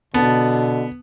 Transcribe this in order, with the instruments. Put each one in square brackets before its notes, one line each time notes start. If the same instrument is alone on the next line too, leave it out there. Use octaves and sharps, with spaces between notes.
[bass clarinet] B2 [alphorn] D3 [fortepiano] B3 [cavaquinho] A5